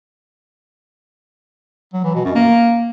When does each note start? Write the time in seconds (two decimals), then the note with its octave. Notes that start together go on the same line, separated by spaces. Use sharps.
1.94 F#3
2.04 E3
2.14 B2
2.25 F#2
2.35 A#3